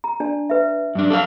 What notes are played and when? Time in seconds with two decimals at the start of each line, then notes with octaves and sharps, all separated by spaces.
0.04 A#5
0.20 D4 D5 A5
0.50 B4 E5
0.95 G2 D4
1.10 A4 C#5 F5